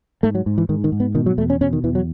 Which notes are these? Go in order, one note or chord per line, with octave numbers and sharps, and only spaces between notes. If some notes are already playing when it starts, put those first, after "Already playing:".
G#2 A3
F#3
G#2
E3
G#2 D#3
D#3
G#2
B3
B2 D#3
F#3
E2 A3
C#4
B2 C#4
D#3
E2 E3
F#3